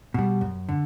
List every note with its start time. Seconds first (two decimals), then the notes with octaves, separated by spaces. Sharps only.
0.14 B2 G3
0.41 F#2
0.69 D3